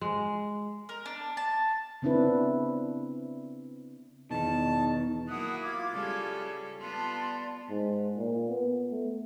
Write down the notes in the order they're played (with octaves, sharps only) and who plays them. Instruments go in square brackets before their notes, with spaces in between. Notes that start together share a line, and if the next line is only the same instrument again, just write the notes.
[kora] G#3
[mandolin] A#4
D4
A5
[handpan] C#3 B3 C4 D4 E4 B4
[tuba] E2 [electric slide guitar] B2 D#3 [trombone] D#4 [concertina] A5
[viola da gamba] F#3 A#3 E4 [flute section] F#5 D#6 F#6
[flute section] F4 D6 G#6
[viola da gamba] C#3 G3 A4
[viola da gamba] B3 F4 [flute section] D5 A5 C6
[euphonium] G#2
A#2
B3
A3